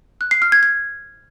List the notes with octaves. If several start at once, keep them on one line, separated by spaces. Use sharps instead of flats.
F#6
C7
F6
G#6
G#6